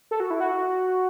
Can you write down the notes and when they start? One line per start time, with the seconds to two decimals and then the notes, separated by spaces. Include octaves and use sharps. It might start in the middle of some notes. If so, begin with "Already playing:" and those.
0.11 A4
0.20 F#4
0.30 E4
0.40 F#4